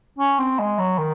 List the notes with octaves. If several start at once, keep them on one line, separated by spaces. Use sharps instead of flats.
C#4
C4
G#3
F#3
D#3